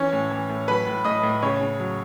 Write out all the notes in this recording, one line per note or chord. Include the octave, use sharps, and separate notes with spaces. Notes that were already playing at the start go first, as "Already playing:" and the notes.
Already playing: E3 C#4 C#5
A2
E3
A2
F#3 B4 B5
A2
A2 D#5 D#6
A2
C#3 C#5 C#6
C#3
F#3